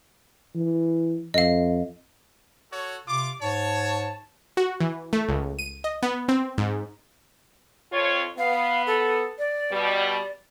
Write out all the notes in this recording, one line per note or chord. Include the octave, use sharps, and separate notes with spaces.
E3
F2 D#5 F5
F#4 A4 C#5
C3 F4 D6
G#2 C#5 A5
F#4
E3
A3
C#2
D#7
D#5
B3
C4
G#2
F2 F4 C#5
B3 F5
A4
D5
B2 G3